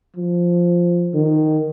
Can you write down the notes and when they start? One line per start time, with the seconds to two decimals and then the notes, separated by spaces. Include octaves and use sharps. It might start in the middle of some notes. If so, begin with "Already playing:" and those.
0.16 F3
1.14 D#3